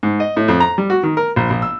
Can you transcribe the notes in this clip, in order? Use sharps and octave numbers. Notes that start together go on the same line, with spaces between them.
G#2
D#5
A2
F2
A#5
G3
F#4
D#3
A#4
A#1
A#1
E6